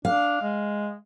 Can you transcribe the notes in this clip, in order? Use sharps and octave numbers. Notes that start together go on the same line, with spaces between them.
D4 F5
G#3